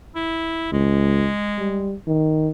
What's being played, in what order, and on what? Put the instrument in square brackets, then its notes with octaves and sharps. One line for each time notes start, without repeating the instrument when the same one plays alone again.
[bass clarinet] E4
[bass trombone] C#2 [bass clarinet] G#3
[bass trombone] G3
D#3